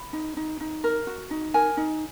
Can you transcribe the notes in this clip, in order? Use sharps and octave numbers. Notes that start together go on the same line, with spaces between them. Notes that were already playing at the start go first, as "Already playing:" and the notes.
Already playing: B5
D#4
D#4
D#4
A#4
F#4
D#4
A#4 G#5
D#4